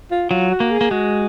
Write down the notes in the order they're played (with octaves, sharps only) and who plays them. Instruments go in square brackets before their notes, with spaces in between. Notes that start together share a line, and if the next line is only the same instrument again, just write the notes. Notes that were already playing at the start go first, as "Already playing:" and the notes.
[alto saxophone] F4
[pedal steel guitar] F#3 [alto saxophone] F4
[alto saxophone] F#4
[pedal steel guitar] A#3
[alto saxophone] G#4
[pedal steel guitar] A#3
[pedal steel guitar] G#3 [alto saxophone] F#4